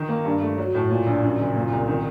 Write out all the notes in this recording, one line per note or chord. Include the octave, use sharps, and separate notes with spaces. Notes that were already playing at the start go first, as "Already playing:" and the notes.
Already playing: D#3
A#3
G2
A3
F#3
A2
A#2
A#1
F#2
F#1
A#2
C2
D#3